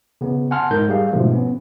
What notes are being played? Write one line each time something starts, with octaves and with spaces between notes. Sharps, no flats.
C#3 B3
F#5 G#5 A5 C6 F6
G#2 D#4 A#4 G6
G3 G4 G#4 F5
G#2 B2 D3 F3 A3
B3 C#4